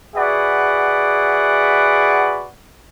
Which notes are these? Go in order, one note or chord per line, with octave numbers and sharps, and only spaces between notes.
F#4 G#4 B4 D5 E5 F#5